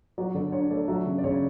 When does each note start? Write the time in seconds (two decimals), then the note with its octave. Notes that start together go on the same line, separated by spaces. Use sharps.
0.18 F#3 D5
0.34 D3 D5
0.52 D4 C#5
0.71 A3 D5
0.88 F#3 E5
1.06 C#3
1.18 D5
1.24 C#3 C#5